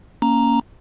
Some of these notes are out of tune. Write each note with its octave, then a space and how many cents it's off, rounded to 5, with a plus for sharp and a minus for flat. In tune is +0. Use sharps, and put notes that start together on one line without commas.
A#3 +0 C#4 +0 A#5 +0